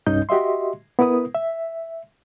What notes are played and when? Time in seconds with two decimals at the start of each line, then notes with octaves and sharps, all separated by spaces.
0.06 C2 G2 C#4 D#4 D#5 G6
0.29 F#4 G4 D#5 E5 C6
0.99 B3 E4 A#4 B4 D#6
1.35 E5